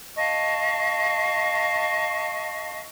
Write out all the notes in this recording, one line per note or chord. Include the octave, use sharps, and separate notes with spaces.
D#5 F5 A5 C#6